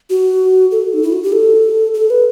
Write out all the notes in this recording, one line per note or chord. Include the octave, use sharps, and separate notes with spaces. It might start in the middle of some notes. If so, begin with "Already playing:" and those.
F#4
A4
D#4
E4
F#4
G4
A4
A4
B4